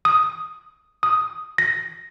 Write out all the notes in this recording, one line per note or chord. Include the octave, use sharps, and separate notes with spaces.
D#6
D#6
A#6